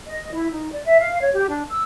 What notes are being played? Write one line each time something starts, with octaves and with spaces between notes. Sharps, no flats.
D#5
E4
D#4
D5
E5
F5
C#5
G4
D4
E6